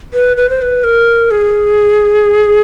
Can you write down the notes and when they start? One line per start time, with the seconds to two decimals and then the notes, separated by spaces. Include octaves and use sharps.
0.14 B4
0.37 B4
0.50 C5
0.62 B4
0.84 A#4
1.31 G#4